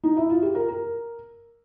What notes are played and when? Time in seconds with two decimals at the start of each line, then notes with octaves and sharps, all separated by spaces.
0.03 D#4
0.17 E4
0.30 F4
0.42 G4
0.55 A#4
0.69 A#4